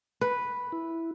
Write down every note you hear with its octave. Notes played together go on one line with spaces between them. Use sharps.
B4
E4